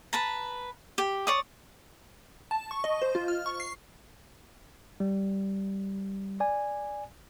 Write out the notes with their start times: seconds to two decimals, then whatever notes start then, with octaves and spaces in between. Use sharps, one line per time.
0.13 B4 A5 A#5
0.98 G4
1.27 C#5 D5 D#6
2.51 A5
2.71 C#6
2.84 D#5
3.02 C5
3.15 F4
3.28 F6
3.46 C#6
3.60 C7
5.00 G3
6.40 D5 G#5